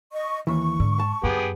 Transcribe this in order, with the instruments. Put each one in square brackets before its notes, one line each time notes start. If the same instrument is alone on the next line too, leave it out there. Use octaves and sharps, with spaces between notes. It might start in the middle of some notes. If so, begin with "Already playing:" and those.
[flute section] D#5 C#6
[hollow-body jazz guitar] D#2 E3 [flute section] C#6
[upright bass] G#2 [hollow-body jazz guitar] D3
[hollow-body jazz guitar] A5
[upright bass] F#2 [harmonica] B3 G4 G#4